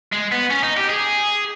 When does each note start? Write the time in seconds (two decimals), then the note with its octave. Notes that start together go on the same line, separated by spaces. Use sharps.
0.12 G#3
0.32 B3
0.50 C#4
0.63 D#4
0.77 G4
0.89 G#4